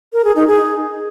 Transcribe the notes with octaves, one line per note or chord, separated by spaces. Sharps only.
A#4
G#4
D#4
G#4